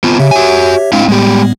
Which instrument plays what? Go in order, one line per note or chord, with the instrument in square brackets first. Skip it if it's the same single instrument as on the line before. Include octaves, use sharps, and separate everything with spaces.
[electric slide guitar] B3 C4 F4
[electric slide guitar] C#3 [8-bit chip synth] G4 C#5 E5
[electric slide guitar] F#4 G#5
[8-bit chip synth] G#3 D4 [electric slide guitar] C4 E4 F5
[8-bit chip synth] A2 G3 B3 [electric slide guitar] G#3 G4